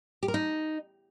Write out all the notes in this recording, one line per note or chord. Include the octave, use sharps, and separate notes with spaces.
G4
A#4
D#4